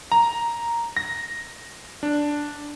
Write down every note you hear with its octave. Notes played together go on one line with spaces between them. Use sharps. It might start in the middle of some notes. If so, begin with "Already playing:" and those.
A#5
A#6
D4